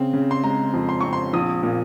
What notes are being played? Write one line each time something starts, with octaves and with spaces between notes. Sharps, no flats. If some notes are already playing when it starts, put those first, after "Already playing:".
Already playing: C#3 C4
C#3
C6
G#3 A#5
F2
C6
C4 C#6
C6
A#1 D#6
A#2